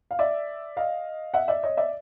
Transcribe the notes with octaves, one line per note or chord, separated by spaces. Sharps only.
F5
D5 E5
D#5 F5
E5 F#5
D5 E5
C#5 D#5
D5 E5